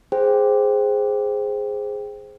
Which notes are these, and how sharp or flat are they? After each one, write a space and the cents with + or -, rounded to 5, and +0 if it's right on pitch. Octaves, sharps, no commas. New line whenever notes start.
G#4 +0 C5 +0 G5 +0